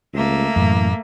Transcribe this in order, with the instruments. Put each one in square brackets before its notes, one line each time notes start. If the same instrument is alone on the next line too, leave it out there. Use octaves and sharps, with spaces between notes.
[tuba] C#2 [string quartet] A3 A#3
[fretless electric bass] F#2 A2 [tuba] E3